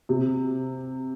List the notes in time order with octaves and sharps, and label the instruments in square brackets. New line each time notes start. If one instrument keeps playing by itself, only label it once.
[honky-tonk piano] C3